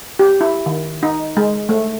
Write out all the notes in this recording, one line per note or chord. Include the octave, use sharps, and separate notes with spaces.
G4
E4
D#3
D#4
G#3
A3